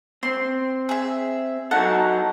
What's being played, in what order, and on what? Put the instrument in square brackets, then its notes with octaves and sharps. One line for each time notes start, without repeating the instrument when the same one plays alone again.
[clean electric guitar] C4 [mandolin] C6
[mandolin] G#4 E5
[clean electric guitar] F#3 D#4 A4 [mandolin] F#5